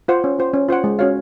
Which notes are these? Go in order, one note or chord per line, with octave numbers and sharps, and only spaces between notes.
F4 C5 F#5
C#4
F4 C5 F#5
C#4
F4 C5 F#5
G#3
C#4 F#4 C#5 F5